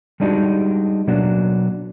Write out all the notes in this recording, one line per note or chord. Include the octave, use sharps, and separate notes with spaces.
G3 G#3 D4 D#4 F#4 G4
B2 F#3 A#3 D4 F#4